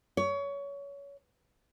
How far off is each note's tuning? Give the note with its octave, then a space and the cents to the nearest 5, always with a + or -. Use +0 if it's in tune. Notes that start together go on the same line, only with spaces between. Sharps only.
C#5 +25